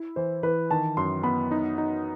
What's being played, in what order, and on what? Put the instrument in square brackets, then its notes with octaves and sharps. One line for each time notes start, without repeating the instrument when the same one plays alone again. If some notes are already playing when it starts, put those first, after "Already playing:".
Already playing: [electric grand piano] E4
[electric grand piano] E3 [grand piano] C5
[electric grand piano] E3 [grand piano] B4
[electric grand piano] D#3 [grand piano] A5
[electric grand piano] F#2 [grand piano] C6
[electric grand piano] B3 [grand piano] B5
[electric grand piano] D#4
D#4